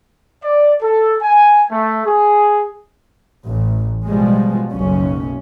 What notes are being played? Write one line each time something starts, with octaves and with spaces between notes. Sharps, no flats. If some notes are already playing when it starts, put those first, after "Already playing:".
D5
A4
G#5
A3
G#4
A1
B2 F3 G3 G#3
F#1 B1 F#2 C#4